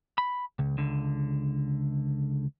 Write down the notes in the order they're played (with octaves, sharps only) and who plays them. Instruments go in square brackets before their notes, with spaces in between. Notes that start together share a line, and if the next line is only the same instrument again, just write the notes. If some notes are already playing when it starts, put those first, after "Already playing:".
[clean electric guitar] B5
C#2
C#2 D3